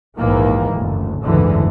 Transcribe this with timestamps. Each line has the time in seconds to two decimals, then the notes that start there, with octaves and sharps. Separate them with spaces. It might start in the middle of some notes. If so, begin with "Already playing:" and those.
0.16 A#1 D#2 G#2 D#3 E3 A#3
0.72 F#1 D2 A2
1.23 F#1 D2 G#2 D3 E3